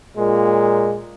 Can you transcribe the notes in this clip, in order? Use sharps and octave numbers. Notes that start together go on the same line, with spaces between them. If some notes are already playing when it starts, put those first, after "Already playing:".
A#2 G#3